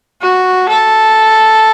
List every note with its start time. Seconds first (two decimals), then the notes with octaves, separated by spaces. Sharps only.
0.22 F#4
0.69 A4